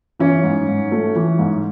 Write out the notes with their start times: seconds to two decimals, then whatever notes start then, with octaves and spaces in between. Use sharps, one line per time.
0.20 E3 C#4
0.43 G#2
0.67 G#2
0.91 A3
1.15 E3
1.39 G#2